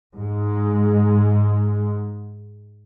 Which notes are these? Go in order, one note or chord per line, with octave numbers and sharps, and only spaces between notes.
G#2 G#3